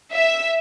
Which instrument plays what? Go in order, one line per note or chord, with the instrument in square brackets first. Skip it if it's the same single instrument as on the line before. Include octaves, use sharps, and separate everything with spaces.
[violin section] E5